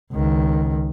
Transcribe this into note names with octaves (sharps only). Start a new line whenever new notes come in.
C#2 D#3